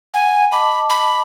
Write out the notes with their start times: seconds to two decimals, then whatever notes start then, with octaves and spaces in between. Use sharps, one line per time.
0.14 F#5 G#5
0.52 D#5 A5 B5 D6
0.90 B5